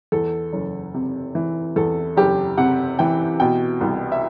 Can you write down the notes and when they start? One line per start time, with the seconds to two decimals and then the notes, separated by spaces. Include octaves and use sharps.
0.12 E2 A4
0.53 F#1
0.94 C3
1.35 E3
1.76 E2 A4
2.17 F#1 G4
2.58 C3 F#5
2.99 E3 G5
3.40 B2 G5
3.81 C2
4.12 E5